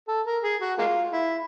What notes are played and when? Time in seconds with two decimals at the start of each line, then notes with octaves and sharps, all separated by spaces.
0.08 A4
0.26 A#4
0.44 G#4
0.61 F#4
0.78 G#3 A#3 F4
1.13 E4